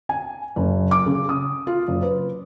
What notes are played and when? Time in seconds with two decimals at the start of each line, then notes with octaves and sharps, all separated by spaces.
0.09 G#5
0.56 F#1
0.91 D6
1.06 C#3
1.29 D#6
1.67 F4
1.88 F#1
2.02 B4